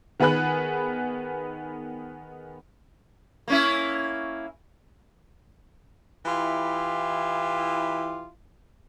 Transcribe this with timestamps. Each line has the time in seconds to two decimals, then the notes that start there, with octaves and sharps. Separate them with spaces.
0.20 D#3 B3 G#4 B4 B5 F#6
3.48 A#3 C#4 E4
6.26 E3 E4 F4 G4